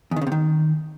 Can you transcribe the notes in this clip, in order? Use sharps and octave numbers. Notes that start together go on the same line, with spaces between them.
E2
D#3
C#3
C3
D#3